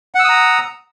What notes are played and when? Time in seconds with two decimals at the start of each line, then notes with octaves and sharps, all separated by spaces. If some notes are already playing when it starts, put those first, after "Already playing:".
0.15 F#5
0.19 E6
0.24 D#6
0.29 A#5